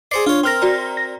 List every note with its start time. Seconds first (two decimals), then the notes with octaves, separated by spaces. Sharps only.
0.11 G#4 C5 D5 C7 C#7
0.26 D4 F4 C#5
0.44 C4 A#4 C6 F6 A#6
0.62 F#4 D5 A#5
0.97 A#6